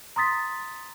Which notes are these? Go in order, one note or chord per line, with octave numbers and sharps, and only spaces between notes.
A#5 C6 D#6 A6 B6